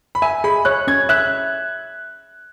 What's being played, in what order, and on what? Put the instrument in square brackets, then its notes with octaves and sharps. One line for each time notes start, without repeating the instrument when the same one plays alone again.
[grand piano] B5
[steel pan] E5 [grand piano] G#5
[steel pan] G#4 [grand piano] B5
[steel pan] C#5 [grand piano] F#6
[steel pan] C#4 [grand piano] G#6
[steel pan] E5 [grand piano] F#6